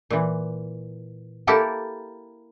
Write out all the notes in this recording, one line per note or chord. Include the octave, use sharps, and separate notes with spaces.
A#2 E3
A#3 E4 G4 A4 A#4